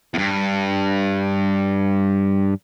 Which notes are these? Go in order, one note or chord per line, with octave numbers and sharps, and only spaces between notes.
E2 G2